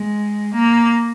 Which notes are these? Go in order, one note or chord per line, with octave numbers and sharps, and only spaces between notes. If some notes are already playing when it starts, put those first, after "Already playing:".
Already playing: G#3
A#3